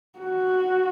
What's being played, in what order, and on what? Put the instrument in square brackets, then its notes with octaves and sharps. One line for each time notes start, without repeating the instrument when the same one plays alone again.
[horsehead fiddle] F#4